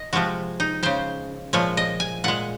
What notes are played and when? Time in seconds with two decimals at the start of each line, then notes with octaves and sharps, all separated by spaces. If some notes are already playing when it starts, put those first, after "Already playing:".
Already playing: D#5
0.13 C3 F3 G#3 F#4
0.60 D#4
0.83 C#3 G#3 C5
1.53 A#2 F3 G#3 C#5
1.77 D#5
2.00 G#5
2.24 A#2 G#3 F#5